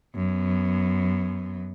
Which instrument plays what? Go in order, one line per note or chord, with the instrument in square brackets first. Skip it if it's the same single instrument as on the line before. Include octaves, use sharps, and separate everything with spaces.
[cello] F#2 B3